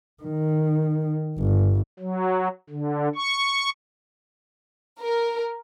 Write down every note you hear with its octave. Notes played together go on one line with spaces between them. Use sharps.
D#3
G1
F#3
D3
C#6
A#4